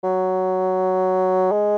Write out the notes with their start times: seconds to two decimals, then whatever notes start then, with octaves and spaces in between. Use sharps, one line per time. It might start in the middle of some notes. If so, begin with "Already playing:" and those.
0.04 F#3
1.52 G#3